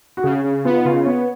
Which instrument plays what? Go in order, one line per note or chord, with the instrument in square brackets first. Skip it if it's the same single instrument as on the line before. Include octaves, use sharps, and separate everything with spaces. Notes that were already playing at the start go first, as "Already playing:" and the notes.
[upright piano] F#4
[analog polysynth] C#3 [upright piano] G#4
[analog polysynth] C#3
[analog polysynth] B3 [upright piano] F4
[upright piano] D#4
[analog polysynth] C#3 [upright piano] F4
[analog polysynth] B3 [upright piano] C#5